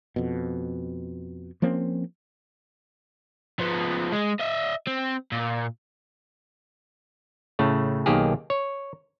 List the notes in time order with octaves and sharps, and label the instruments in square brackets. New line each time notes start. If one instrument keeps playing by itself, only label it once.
[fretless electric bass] F2 B2
F3 A#3 C4 C#4
[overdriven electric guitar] F3 B3
G#3
D#5 E5
C4
A#2
[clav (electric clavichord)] A2 C#3 A3
B1 D#3 A#3 G4 G#4
C#5